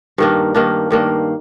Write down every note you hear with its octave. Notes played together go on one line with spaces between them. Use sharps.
G2 D#3 A#3 D4
G2 D#3 A#3 D4
G2 D#3 A#3 D4